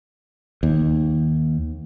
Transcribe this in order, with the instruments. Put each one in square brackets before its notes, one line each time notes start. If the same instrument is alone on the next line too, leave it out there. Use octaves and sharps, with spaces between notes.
[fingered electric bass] D#2